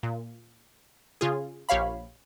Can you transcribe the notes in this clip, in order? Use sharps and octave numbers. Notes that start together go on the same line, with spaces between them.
A#2
C#3 F4 G#4
A#1 G4 C#5 F5 B5